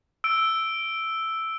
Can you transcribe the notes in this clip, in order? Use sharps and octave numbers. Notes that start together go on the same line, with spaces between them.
E6 D7